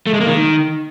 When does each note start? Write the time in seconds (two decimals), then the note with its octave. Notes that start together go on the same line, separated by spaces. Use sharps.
0.07 A3
0.13 G#3
0.20 A#3
0.27 D#3